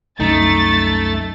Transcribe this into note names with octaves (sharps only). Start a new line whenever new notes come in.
C2 F#2 A3 D#4 A6